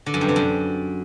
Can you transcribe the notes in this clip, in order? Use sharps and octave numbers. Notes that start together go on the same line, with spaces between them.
D3
F#2
G2
C3
F#2